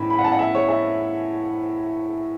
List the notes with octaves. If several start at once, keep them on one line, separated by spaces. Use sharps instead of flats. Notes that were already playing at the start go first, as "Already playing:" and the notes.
Already playing: A2 E3 B5
B5
F#5
A5
F#5
E5
C#5
E5